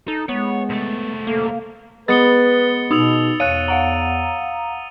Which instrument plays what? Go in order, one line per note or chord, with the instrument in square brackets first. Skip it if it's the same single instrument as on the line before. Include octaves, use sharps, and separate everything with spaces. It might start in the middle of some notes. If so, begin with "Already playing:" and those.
[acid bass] D#4 [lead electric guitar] A4
[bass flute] G#3 [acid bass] B3 [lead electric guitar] C#5
[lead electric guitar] C2 A3
[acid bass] A#3 [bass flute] A4
[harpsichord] G#3 B3 [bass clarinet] B4 [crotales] A6 C#7 G7
[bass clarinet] B2 [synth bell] D#4 [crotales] D#6 E6 F7
[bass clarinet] E2 [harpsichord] C#5 [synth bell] F5 F#6 [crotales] D#7
[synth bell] F5 F#5 A#5